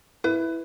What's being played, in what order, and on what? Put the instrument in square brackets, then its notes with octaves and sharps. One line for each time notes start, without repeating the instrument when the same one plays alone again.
[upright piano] E4 [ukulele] B4